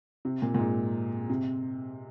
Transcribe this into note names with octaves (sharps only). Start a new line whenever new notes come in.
C3
A#2
A#2
G#2
C3